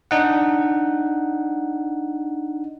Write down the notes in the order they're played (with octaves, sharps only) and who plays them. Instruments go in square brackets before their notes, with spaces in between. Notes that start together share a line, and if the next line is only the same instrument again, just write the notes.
[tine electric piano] D4 D#4 F#5